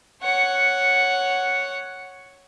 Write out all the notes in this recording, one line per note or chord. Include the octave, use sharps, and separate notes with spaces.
C#5 F#5